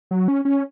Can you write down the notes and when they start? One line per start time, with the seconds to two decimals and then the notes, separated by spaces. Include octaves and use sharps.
0.11 F#3
0.28 C#4
0.45 C#4